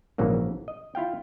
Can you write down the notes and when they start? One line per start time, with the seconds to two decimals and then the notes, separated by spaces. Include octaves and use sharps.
0.18 A#1 G#2 C#3 E3 F#3 A#3
0.68 D#5
0.95 E4 F4 F5 G5